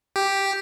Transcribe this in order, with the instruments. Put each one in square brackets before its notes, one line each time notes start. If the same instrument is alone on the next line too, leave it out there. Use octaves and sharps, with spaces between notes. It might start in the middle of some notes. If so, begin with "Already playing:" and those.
[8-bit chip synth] G4